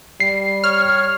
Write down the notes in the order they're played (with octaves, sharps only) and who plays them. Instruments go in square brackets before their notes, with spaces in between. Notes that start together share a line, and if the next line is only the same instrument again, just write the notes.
[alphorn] G3 [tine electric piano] C7
[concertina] C#5 [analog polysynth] F6